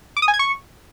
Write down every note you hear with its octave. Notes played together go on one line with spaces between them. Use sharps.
D6
D#6
G#5
G#6
C#6